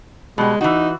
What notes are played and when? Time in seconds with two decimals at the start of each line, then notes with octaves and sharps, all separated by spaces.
0.38 B2 G3 G#3
0.61 E3 D#4 F#4